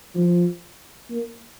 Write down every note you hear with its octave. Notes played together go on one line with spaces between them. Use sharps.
F3
A#3